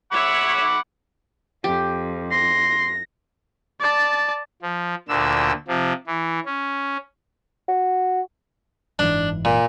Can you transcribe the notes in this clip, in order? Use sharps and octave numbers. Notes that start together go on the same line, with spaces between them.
C#5 E5 F#5 B5 D6
F2 G4
C6 A#6
D5 A5
F3
D2 A#2 D3 E6
C3 F3
E3
C#4
F#4
F#1 G#2 E3 D4
A#2